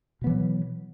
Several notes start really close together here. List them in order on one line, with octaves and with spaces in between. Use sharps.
B2 B3 E3 F#3